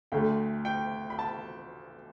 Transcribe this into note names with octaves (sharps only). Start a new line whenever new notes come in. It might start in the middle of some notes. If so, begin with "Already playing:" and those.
D2 D3 A3 G5
G5
B5
A5